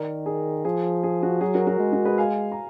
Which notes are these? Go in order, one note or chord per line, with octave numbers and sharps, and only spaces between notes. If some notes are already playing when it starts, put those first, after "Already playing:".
Already playing: D#3 A#4 D5
G#4
F3 G#4
G#4
F#4
F#3 G#4
F#4 A#4
F#4 A#4
G#3
F#4 A#4
G#4 B4
F5 G#5
A#5